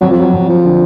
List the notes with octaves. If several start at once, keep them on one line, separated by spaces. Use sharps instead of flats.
F2 F#3
F3
F#3
F2
F3
D3